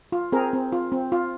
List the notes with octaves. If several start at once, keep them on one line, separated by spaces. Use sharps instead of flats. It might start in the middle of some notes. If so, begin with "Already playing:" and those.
F4
C4 G#4 A#4
C4
F4
C4
F4